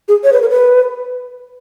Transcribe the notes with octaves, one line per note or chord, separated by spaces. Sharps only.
G#4
C#5
B4
A#4
B4